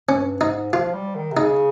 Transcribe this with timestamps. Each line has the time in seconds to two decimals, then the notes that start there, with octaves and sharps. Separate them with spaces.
0.09 G2 C#4
0.41 G#2 D#4
0.73 F3 F4
0.94 G3
1.15 D#3
1.32 C3
1.37 C#3 D#4